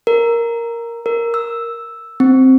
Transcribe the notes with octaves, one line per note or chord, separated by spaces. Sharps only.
A#4
A#4
E6
C4